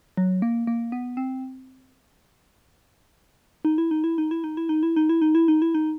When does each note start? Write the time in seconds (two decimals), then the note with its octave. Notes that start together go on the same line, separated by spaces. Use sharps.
0.17 F#3
0.42 A#3
0.67 A#3
0.92 B3
1.17 C4
3.65 D#4
3.78 E4
3.91 D#4
4.04 E4
4.18 D#4
4.31 E4
4.44 D#4
4.57 E4
4.69 D#4
4.83 E4
4.96 D#4
5.09 E4
5.22 D#4
5.35 E4
5.48 D#4
5.62 E4
5.75 D#4